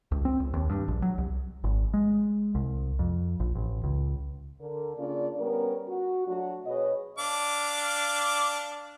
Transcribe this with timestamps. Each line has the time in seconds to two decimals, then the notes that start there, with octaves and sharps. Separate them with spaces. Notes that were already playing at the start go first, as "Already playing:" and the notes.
0.12 C#2
0.25 C4
0.40 C#2
0.54 D#2
0.70 G2
0.88 A#1
1.02 F#3
1.18 C2
1.64 G#1
1.94 G#3
2.55 C2
2.99 F2
3.40 A#1
3.55 A1
3.84 C#2
4.60 D3 A#4
4.97 C#3 A#3 C#4 D4 F4 D5
5.39 G3 B3 C#4 A#4
5.89 F#4
6.27 F#3 A3 D4 F#4
6.66 B2 G#4 B4 C#5 D#5
7.18 D4 F5 D6